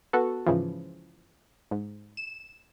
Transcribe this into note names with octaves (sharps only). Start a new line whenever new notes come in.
B3 F#4 A4
G#2 C#3 E3 F3
G#2
E7